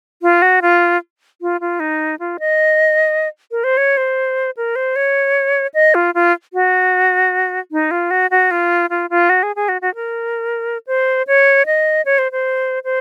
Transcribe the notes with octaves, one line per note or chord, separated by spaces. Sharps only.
F4
F#4
F4
F4
F4
D#4
F4
D#5
A#4
C5
C#5
C5
A#4
C5
C#5
D#5
F4
F4
F#4
D#4
F4
F#4
F#4
F4
F4
F4
F#4
G#4
G#4
F#4
F#4
A#4
C5
C#5
D#5
C#5
C5
C5
C5